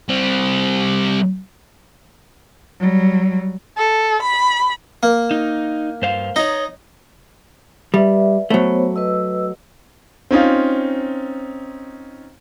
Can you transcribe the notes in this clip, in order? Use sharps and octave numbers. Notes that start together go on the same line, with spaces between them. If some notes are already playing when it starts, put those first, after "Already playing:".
G3 C4
F#3 G3
A4
B5
A#3
D#4
G2 C5 F5
D#4 C#5 D#5
G3 B4 D5 E5
F#3 A3 B3 C5 C#5
B4 D#5 E6
C4 C#4 D#4 F4